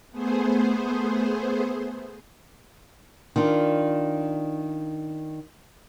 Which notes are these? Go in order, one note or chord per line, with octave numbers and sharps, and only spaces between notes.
A3 B3 G#4 C5
D#3 D4 F4